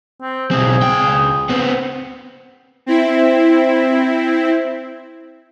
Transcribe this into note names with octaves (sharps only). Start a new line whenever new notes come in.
C4
B1 C4 G#4
C#2 G5
B3 C4
C4 E4